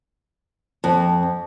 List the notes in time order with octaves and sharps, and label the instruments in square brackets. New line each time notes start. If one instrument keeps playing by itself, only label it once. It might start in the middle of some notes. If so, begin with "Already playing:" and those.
[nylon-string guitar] F2